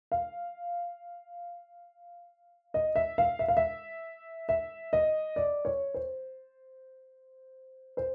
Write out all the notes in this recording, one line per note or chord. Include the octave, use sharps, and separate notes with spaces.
F5
D#5
E5
F5
E5
F5
E5
E5
D#5
D5
C#5
C5
C5